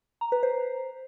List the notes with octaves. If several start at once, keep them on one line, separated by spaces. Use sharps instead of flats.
A#5
B4
C5